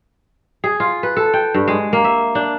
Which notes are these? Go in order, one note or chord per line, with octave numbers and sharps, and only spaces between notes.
G#4
F4
B4
A4
G5
G2
G#3
A#3
E5
D4